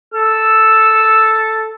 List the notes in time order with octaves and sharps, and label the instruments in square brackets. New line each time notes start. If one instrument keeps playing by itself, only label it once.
[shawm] A4 [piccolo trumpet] E6